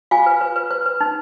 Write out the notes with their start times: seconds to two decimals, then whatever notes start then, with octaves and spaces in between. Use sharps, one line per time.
0.11 F4 F5 G#5
0.26 B4
0.41 B4
0.56 B4
0.71 B4
0.86 B4
1.01 D#4